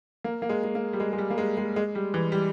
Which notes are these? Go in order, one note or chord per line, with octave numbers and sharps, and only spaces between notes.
A#3
A#3
G#3
G#3
A#3
G3
G#3
G#3
G3
A#3
G#3
G#3
G#3
G3
E3
G3